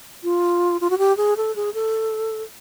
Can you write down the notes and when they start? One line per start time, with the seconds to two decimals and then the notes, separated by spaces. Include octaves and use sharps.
0.24 F4
0.81 F4
0.90 F#4
0.98 G4
1.17 G#4
1.37 A4
1.56 G#4
1.74 A4